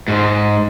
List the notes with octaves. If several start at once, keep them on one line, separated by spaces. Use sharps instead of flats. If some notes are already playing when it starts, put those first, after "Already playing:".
G#2